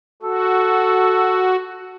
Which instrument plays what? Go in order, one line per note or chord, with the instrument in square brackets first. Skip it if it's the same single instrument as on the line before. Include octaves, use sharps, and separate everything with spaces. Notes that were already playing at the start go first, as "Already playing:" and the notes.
[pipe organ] F#4 [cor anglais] A4